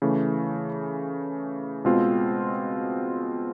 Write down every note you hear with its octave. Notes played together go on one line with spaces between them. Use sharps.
C#3 E3 A3
B2 G#3 C4 F4